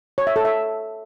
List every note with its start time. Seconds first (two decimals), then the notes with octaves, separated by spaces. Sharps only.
0.18 C#5
0.27 E5
0.36 A4
0.45 E5